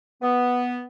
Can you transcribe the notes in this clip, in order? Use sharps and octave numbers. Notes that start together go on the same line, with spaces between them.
B3